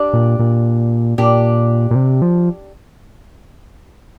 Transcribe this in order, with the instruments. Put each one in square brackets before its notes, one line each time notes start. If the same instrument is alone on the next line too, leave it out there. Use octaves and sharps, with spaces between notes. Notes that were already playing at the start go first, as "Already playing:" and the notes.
Already playing: [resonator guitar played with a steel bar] D4 G4
[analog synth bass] A#2
A#2
[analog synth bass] A#2 [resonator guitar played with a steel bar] D4 G4
[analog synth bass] A#2
C3
F3